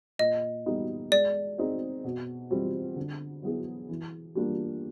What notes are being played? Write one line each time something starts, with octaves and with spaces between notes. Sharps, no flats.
A#2 D#5
G3 B3 D#4
G#3 D5
C4 D#4 G#4
B2
G3 C4 F4
D3
F#3 B3 E4 G#4
E3
G3 A#3 D4 F4